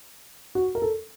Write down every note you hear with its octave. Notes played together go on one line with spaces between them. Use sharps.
F#4
A#4
A4